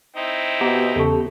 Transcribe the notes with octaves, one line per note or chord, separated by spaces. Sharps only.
C4 D#4 E4
B2 B3 G4 A#5
E2 C#3 A4 C#6